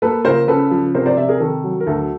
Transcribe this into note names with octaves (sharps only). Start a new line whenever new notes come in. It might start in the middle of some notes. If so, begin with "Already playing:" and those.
A#3 A4 B4
C#2 A#4 C5
C#3 A4 B4
F3
C3 A#4 C5
C5 D5
C3 D5 E5
G#4 A#4
D#3 A4
F#3
A#4
D2 A4